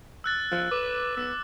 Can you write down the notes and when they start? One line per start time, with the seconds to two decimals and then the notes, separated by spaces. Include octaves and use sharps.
0.24 E6 F#6 A6
0.52 F3
0.71 B4 D6
1.17 B3 E6